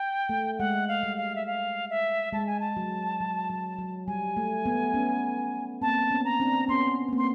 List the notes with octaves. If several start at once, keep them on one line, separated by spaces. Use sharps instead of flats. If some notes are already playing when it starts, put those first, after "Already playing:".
Already playing: G5
A3
G#3 F#5
F5
G3
F5
E5
F5
E5
G#3 A5
G#5
A5
F#3
F#3
F#3
F#3
G3 G#5
A3
A3 B3
B3 C#4
A#3 C4 A5
B3 C#4
A#5
C4 D4
B3 C#4 C6
B3
A#3 C4
C6